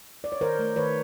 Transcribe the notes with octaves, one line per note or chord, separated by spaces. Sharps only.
D5
C#5
D#3 A#4 C5
A3
D#3 B4 C#5